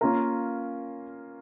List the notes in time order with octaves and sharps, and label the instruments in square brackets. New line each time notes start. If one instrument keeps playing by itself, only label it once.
[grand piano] A#3 C#4 F4 A#4